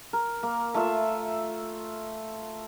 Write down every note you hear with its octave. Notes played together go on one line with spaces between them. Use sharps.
A#4
A#3
A3 F4 E5